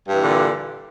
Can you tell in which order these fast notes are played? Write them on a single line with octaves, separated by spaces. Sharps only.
G2 E3 A#2 D3